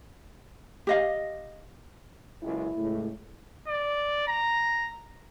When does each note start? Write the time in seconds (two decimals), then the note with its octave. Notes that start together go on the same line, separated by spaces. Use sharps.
0.87 G4 D#5 F5
2.43 F#1 C#2 E4
2.77 C#2 A2
3.68 D5
4.27 A#5